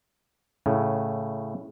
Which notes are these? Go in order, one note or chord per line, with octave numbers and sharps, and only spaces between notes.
A2 C#3